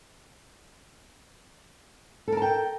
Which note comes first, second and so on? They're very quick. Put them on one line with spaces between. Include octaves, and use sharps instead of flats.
A4 A#4 A5 G5